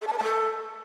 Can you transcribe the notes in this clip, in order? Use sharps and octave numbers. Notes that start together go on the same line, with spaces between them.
A4
A5
B4
A5
A4